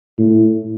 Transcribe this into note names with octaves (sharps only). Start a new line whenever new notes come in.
A2